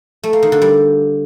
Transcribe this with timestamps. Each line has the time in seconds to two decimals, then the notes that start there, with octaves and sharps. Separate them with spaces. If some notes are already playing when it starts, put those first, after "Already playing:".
0.24 A3
0.33 A#3
0.43 D#3
0.52 D3
0.62 G3